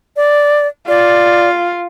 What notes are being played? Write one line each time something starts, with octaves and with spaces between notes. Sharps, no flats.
D5
F4 D5